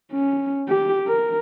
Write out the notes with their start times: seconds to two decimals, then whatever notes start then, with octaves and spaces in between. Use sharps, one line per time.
0.12 C#4
0.69 G4
1.07 A#4